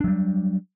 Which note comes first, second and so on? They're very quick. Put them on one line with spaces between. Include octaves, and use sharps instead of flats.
D4 F#3 G3